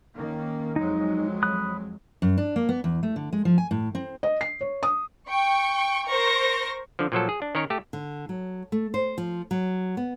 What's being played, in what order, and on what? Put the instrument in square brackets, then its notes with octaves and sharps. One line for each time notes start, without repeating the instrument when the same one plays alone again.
[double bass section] D#3 A#3 C#4
[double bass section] F2 F#3 G#3 [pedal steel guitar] D#4
[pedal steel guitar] B5 D#6 F#6
[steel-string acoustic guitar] F#2
D4
A#3
B3
E2
A3
D3
G#3
F3
G#5
A2
C4
[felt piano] D#5
C7
C#5
D#6
[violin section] G5 C#6
A#4 C5 C#6 A#6
[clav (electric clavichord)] D3 F3
A#2 F3 F#3 A4
G#4
D4
D#3 C#4 A#4 C#5
A3 G4
[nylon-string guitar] D3
F#3
A3
C5
F3
F#3
B3